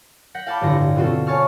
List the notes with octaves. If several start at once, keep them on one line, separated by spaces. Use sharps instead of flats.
F#5 G6 A#6 B6 C#7
F5 G5 A5 B5 D6
A1 G2 D3 F4 A#6 C#7
B2 C4 F4 F#4 A4
C#5 G#5 A5 C#6 F6